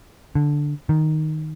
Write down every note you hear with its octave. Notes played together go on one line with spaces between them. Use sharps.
D3
D#3